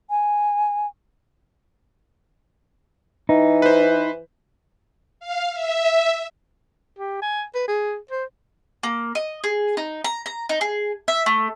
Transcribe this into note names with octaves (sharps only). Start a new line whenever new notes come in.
G#5
E3 D#4
B4 C5
F5
E5
G4
G#5
B4
G#4
C5
A#3
D#5
G#4
D#4
A#5
A#5
D#4
G#4
E5
A3